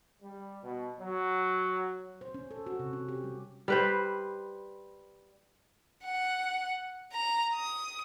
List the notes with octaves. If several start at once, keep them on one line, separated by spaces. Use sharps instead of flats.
G3
B2
F#3
C5
C#4
A4
F#4
C3
C#4
G4
G3
G3 B4 C5
F#5
A#5
D#6